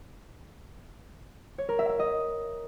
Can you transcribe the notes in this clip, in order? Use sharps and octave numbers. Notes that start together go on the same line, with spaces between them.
C#5
A#4
E5
E5
D#5